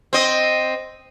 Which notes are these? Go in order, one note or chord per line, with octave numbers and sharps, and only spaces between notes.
C4 D#5